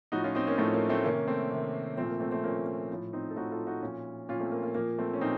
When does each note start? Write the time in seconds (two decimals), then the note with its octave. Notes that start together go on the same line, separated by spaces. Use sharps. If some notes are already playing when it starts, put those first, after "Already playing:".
0.12 A2 F3 D#4 F#4
0.24 C#4 F4
0.35 C4 D#4
0.47 A#3 C#4
0.58 A2 F3 A3 C4
0.74 A#3
0.89 A3 C4
1.04 C3 D#3 A#3 C#4
1.27 A3 C4
1.51 C3 D#3
1.97 A#2 F3 A3 C4
2.09 A#3
2.20 A3 C4
2.32 A3 C4
2.43 A#2 F3 A#3 C#4
2.66 A#3
2.90 A2 F3
3.13 C4 D#4
3.30 A4
3.36 A2 F3 D#4 F#4
3.51 F4 A4
3.67 D#4 F#4
3.82 A#2 F3 C#4 F4
4.29 A#2 C#4 F4
4.33 F3
4.40 A3 C4
4.52 A#3
4.63 A#3
4.75 A#2 F3 A#3
4.98 A3 C4
5.13 C#4
5.21 A#2 F3 C4 D#4